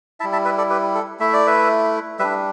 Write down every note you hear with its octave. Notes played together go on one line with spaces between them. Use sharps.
G3 E4 E5 A5
E5 A5
B4 E5
A4 D5
G4 B4
A4
A3 E4 E5
D5
B4 E5
G3 D4 B4 E5